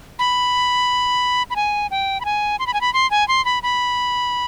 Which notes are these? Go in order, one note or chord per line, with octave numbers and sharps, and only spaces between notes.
B5
B5
G#5
G5
B5
G#5
C6
B5
G#5
B5
C6
G#5
C6
B5
B5